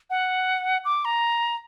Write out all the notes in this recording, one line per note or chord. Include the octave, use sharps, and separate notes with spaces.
F#5
D6
A#5